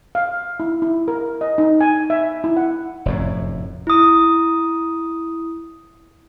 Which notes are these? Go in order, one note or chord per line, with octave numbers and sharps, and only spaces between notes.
F5
E4
E4
A#4
D#5
D#4
G#5
E5
E4
F#5
F1 F#2 A2
E4 D#6